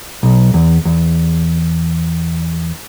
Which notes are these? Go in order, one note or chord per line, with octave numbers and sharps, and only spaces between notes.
B1
E2
E2